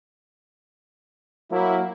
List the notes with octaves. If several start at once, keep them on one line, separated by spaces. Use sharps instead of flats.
F#3 A#3 E4